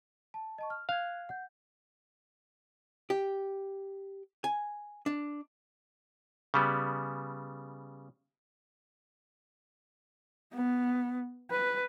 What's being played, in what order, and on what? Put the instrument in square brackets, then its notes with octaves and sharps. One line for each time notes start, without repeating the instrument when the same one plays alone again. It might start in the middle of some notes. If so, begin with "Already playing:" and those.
[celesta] A5
D#5 A5 C#6
F6
[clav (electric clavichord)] F5 [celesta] F#6 G#6
[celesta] F#5 G6
[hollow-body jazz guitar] G4
G#5
D4
[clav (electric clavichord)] C#3 G3 B3
[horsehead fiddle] B3
B4